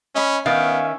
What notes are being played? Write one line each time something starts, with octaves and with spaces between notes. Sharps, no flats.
C#4 D#5 B5
D#3 B3 C#4 E5 F5